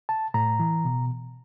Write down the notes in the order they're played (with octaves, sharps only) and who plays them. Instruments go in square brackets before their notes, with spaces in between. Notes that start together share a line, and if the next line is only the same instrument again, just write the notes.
[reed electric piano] A5
A2 A#5
E3
B2